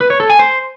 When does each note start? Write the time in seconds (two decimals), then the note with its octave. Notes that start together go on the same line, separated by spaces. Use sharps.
0.01 B4
0.10 C#5
0.20 A4
0.30 G#5
0.39 C5